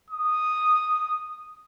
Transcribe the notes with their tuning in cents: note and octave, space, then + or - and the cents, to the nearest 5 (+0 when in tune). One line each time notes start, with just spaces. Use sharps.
D#6 -5